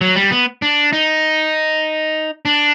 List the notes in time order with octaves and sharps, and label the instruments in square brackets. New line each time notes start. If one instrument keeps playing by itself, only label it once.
[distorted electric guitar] F#3
G3
B3
D4
D#4
D4